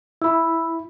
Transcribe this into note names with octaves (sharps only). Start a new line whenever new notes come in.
E4 B5 E6